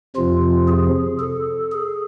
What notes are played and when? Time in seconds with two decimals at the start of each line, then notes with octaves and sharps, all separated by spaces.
0.16 F2 C3 F3 F4
0.68 G#4
1.19 A4
1.72 G#4